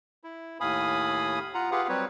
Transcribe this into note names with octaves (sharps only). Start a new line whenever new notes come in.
E4
D#2 A2 F5 G#5 B5 D#6
F4 F#5 A#5
F4 G4 G#4 B4 F5 F#5
F#3 G3 C4 B4 C#5